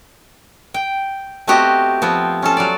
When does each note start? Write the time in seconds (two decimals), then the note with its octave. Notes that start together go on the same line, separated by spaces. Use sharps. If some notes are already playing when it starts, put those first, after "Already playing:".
0.74 G5
1.47 A3 B3 C4 F#4 G4 D#5
2.02 F3 B3 C4
2.42 C#4 F4 A4
2.57 F#3 D5